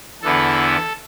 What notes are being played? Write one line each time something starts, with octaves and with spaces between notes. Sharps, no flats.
E2 D3 B3 E4 A4